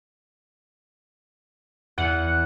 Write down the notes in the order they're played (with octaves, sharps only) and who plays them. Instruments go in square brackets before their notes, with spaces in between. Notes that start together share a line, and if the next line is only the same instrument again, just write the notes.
[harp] E2 [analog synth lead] F#5